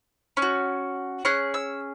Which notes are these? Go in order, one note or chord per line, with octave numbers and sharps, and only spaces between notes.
C#4
F#4
C#4 G#4 F#6
E6